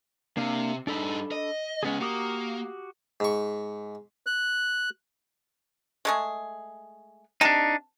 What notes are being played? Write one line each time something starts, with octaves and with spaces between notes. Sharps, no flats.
C3 A#3 D4 F5
G2 D4 D#4 A4 B5
D#5
C#2 G#3 B3 C#4 G#4
A#3 F#4 G4 D#6
G#2 C#6
F#6
G#3 A3 G#4
C3 D4 D#4 A5